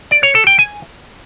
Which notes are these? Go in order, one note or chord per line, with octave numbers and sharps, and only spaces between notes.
D5
C#5
A4
G5
G#5